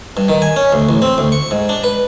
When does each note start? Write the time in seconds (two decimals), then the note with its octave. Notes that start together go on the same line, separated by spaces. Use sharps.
0.17 G2
0.28 D#3
0.42 G#5
0.56 C#4
0.72 D2
0.89 A1
1.02 C4
1.18 D2
1.32 C#6
1.51 G#2
1.69 D4
1.84 B4